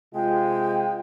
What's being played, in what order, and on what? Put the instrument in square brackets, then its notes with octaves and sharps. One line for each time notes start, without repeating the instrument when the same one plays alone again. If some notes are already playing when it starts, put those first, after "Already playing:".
[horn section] C3 G#3 [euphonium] F4 [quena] G5